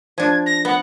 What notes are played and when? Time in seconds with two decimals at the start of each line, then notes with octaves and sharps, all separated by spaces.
0.18 F3 D4 G#6
0.46 A#6
0.65 B3 F#5